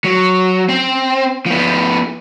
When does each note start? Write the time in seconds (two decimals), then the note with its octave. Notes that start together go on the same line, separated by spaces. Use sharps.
0.04 F#3
0.69 C4
1.46 F3 B3